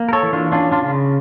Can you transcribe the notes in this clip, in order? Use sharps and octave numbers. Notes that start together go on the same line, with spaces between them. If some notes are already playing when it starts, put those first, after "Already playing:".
Already playing: A#3
A#4
A4 C#5
E3
D4 F4
C#4 D4 F4
D4 F4
C#3